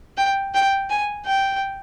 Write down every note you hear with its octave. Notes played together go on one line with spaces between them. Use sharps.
G5
G5
G#5
G5